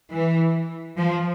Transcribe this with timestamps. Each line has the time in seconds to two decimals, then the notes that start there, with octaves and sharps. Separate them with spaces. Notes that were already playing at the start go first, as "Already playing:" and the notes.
0.10 E3
0.98 F3